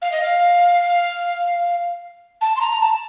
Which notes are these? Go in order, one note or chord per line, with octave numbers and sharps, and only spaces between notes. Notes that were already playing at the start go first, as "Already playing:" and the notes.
F5
D#5
F5
A5
C6
A#5
A#5
A5